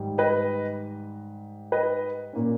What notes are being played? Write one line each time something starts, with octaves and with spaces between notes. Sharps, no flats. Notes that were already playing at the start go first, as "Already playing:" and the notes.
Already playing: G#2 D#3 G3
B4 D#5
B4 D#5
A#2 A#3 C#4